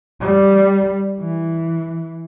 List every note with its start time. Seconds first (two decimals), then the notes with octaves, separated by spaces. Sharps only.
0.21 G3
1.20 E3